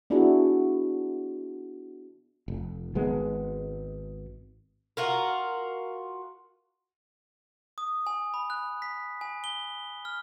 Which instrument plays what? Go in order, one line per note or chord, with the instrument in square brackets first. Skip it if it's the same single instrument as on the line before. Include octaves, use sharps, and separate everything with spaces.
[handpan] B3 D4 E4 F#4 G#4
[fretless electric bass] F1
G#1 G#3 B3
[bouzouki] F4 F#4 A#4
[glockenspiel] D#6
G#5
B5
F#6
B6
G#5
G7
F6